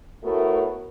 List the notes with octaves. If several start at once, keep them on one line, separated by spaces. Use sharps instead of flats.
A2 A3 B3 F#4 A#4